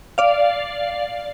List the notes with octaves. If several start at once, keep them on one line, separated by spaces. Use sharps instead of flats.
D5 F5